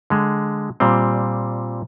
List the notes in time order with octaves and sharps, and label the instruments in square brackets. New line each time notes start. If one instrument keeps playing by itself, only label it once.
[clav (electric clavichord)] D3 G#3
A#2 G3 C4